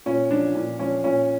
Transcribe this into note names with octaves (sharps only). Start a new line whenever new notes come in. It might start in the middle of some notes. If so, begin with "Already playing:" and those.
A#2 C#4
F3 D4
A#2 D4
F3 C#4
A#2 C#4